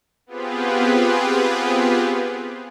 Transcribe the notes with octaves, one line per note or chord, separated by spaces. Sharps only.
B3 C4 F4 G4 G#4 B4